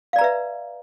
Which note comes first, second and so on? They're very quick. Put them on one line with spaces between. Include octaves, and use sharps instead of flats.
F5 D5 A#5 B4 E5